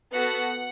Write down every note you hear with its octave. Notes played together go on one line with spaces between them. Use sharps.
B3 F#4 A4 F#5